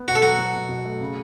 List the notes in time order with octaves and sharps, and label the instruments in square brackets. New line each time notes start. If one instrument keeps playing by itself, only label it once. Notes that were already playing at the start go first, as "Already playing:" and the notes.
Already playing: [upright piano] B3
[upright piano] B2 [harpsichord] F#4
[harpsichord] A4
[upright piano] F#3 [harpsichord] F#4
[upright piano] F#3
B2
B2
A3
C#3